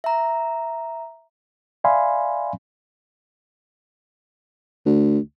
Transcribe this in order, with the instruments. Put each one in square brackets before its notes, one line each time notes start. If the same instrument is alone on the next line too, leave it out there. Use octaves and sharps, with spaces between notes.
[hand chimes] E5 A#5
[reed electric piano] D5 E5 F5 G#5 B5 C6
[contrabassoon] D2